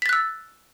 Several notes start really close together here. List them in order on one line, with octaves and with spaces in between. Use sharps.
B6 A6 F#6 E6